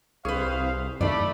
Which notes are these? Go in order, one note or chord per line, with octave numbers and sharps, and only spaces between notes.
C2 G#4 B4 C5 F5 C#6
F#2 C3 D#3 A3 D5 B5